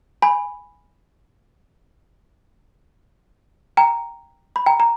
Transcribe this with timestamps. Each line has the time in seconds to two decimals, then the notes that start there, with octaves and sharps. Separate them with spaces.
0.22 G#5 B5
3.77 G5 A#5
4.56 B5
4.66 G5 A#5
4.80 A#5